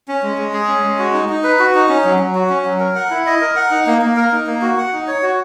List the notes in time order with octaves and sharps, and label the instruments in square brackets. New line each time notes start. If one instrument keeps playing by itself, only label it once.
[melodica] C#4
G#3
G#3
G#4
C#4
G#3
F#4
D#4
D#4
B4
F#4
D#4
C#4
F#3
F#3
F#4
C#4
F#3
A#4
F#5
E4
D#5
A#4
F#5
D#4
A#3
A#3
A#4
D#4
A#3
F#4
F#5
D#4
C#5
F#4